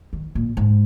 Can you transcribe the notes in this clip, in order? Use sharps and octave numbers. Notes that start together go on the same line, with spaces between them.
D#3
A#2
G#2